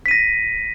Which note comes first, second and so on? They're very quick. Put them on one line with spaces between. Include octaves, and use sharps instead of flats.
B6 D#7 A#6